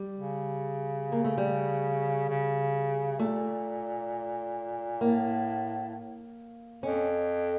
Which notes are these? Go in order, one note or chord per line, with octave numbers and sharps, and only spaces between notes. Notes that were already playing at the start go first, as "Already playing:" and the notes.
Already playing: G3
C#3
A#3
A3
G3
C#3
A#2 A3
A2 A#3
F2 C#4